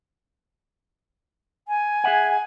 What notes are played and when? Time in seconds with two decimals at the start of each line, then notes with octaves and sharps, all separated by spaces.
1.67 G#5
2.04 G#4 E5 F#5